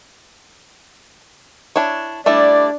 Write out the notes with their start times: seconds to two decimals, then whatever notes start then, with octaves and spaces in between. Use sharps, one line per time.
1.76 D4 E4 C#5
2.26 G3 A3 D4 E4 D5